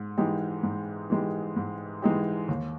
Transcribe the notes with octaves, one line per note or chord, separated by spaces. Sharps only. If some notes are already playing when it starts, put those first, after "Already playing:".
Already playing: G#2
E3 G#3 D#4 G4
G#2
E3 G#3 D#4 G4
G#2
E3 G#3 D#4 G4
D#2